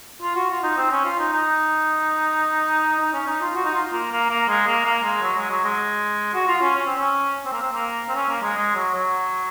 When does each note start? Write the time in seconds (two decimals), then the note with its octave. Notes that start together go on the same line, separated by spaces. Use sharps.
0.22 F4
0.35 F#4
0.50 F4
0.63 D#4
0.77 C4
0.91 C#4
1.05 F4
1.19 D#4
1.32 D#4
3.00 D#4
3.13 C#4
3.27 D#4
3.42 F4
3.55 F#4
3.65 D#4
3.74 F4
3.93 A#3
4.12 A#3
4.30 A#3
4.48 G#3
4.67 A#3
4.85 A#3
5.04 G#3
5.22 F#3
5.37 G#3
5.50 F#3
5.64 G#3
6.34 F#4
6.48 F4
6.62 C#4
6.76 C#4
6.86 C4
6.98 C#4
7.45 C4
7.52 A#3
7.61 C4
7.72 A#3
8.08 C4
8.15 C#4
8.29 A#3
8.42 G#3
8.57 G#3
8.75 F#3
8.93 F#3